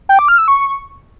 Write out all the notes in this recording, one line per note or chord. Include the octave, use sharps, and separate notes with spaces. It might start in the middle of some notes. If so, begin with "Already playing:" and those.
G5
D6
F6
E6
C#6